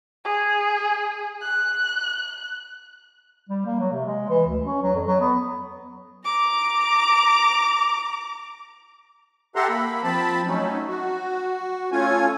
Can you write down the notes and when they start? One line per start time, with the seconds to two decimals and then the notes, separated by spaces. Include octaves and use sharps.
0.24 G#4
1.42 F#6
3.49 G3
3.65 A#3
3.80 F#3
3.92 C3
4.06 G#3
4.29 E3
4.47 D2
4.64 C#4
4.82 F#3
4.95 F2
5.07 F#3
5.20 B3
6.25 A#5 D6
9.56 G4 A4 E5 F#5 A#5 C6
9.69 A#3 B5
10.03 F3 C4 A5 B5
10.46 F#3 A3 C#4 D#4
10.88 F#4
11.92 A3 C#4 F4 G#5